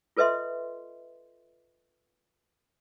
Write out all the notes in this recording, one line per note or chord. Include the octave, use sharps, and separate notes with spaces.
F4 A4 B4 D#5 E5 C6